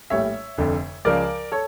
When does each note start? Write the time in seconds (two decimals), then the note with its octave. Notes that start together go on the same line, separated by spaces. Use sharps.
0.10 A#1 A2 G3 C#5 E5
0.58 F1 F2 D3
1.05 C#2 C#3 F3 A#4 D5
1.52 A4 C#5